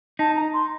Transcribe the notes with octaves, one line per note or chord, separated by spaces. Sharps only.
D#4 A5
A#5
C6